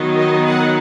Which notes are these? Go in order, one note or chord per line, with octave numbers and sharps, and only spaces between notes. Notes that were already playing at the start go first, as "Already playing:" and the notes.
Already playing: D#3 F#3 B3 D#4
D#5
F#5